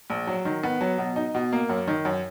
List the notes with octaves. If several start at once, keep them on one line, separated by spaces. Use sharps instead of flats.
A#1
F#3
D#3
B3
F#3
B2
D#4
B2
A#3
F#2
D#3
F#2